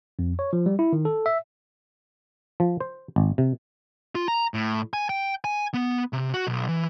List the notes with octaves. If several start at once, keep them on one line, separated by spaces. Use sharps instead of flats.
F2
C#5
F3
G3
E4
D#3
A4
E5
F3
C5
G#1
C3
F4
A#5
A2
G#5
G5
G#5
B3
C3
F#4
B1
E3